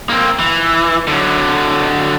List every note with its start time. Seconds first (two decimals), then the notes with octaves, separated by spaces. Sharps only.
0.10 A#3 C4
0.39 E3
1.07 D3 F#3